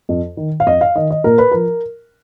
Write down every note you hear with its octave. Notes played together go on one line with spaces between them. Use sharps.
F2
D#3
F5
F2 D#5
F5
D#3 D#5
D#5
A#2 A#4
B4
F3 A#4